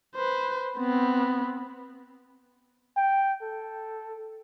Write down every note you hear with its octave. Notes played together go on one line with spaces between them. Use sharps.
B4 C5
B3 C4
G5
A4